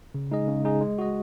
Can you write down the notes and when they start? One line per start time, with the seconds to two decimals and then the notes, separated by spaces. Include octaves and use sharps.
0.14 C#3
0.31 G#3 D#4 G#4 D#5
0.48 C#3
0.64 G#3 D#4 G#4 D#5
0.81 G#3
0.99 F#4 D#5